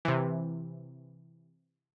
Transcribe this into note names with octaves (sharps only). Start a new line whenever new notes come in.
C3 E3